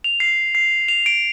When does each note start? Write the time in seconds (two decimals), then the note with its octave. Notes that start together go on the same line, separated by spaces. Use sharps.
0.04 F7
0.20 C7
0.55 C7
0.88 F7
1.06 D7